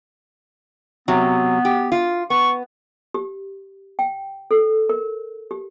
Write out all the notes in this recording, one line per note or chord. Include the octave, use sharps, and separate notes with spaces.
C3 F#3 B3
G4
F4
B3 C#6
G4
G5
A4
A#4
G4